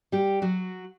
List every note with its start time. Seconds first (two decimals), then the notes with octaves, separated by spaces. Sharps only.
0.12 G3 G4
0.42 F#3 F#4